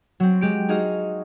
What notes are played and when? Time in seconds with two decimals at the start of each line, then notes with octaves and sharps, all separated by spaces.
0.20 F#3 C4
0.41 G#3 G4 D7
0.68 D#4 F#4 G#4 D#5 F5